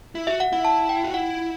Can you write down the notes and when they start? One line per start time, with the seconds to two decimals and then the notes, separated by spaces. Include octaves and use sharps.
0.15 E4
0.27 F#4 E5
0.40 F#5
0.52 E4 F#5
0.65 A5
0.89 G5
1.03 F#4
1.14 E4 F#5